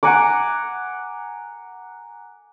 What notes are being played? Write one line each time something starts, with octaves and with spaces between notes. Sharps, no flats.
F#5 G#5 A#5 D6